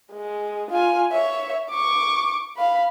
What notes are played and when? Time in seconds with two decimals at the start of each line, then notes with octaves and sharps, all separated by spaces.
0.12 G#3
0.70 F4 G#5
1.12 C#5 E5
1.70 C#6 D6
2.57 F5 B5